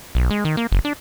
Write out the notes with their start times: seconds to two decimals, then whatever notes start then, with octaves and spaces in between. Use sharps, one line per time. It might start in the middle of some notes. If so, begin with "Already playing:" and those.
0.15 B1
0.31 G#3
0.45 D#3
0.57 A#3
0.72 F#1
0.85 D4